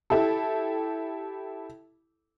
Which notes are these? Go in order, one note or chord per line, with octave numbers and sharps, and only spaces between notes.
E4 G4 A4